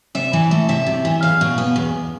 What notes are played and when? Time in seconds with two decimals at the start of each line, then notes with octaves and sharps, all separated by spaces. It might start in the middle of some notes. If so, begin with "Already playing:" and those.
0.15 C3 E5
0.33 E3
0.51 A3
0.69 C3 E5
0.86 C3
1.05 E3
1.22 E2 F5
1.41 B2
1.58 B3
1.76 E2